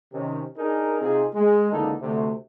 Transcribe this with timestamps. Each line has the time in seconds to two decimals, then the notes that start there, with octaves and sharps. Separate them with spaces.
0.13 C3 D#3 C#4
0.57 D4 D#4 G#4 A#4
1.01 C3 C4 D#4 F4 G#4
1.34 G#3
1.71 C#2 D3 E3 A#3 D#4 A4
2.01 D2 C3 A3